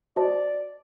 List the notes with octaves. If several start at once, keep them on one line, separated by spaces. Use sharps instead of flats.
F#4 C5 D5 D#5 A5